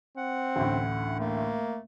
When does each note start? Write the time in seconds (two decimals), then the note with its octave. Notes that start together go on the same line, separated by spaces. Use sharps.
0.18 C4 F#5
0.56 A1 D2 A2
1.19 A3 A#3